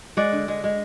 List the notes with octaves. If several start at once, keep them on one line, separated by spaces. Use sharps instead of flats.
G#3 D5 F#5
D3
G#3
G#3